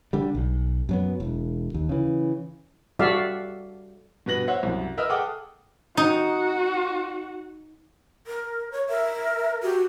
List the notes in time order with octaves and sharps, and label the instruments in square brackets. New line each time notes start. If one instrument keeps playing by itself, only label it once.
[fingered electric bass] D3 G3
B1
F#2 F#3 B3
E1
D#2
C#3 E3
[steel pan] G3 F#4 A4 D5 E5 F5
[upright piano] G2 B2 B3 B4 A#6 F#7
C5 C#5 E5 F#5
C2 F#2
A#4 B4 D#5 E5 E6 F6
G#4 A4 F#5 G5 D6 D#6
[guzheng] D#4 [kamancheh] F#4
[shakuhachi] A#4
C#5
[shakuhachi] A#4 [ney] E5
[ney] F#4 [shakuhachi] G4